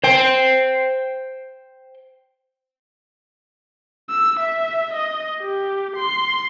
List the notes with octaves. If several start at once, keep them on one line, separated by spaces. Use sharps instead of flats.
C5 G5
E6
E5
D#5
G4
C6